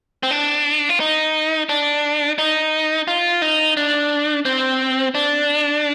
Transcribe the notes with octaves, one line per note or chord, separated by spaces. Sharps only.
C4
D4
F4
D#4
D4
D#4
F4
D#4
D4
C4
D4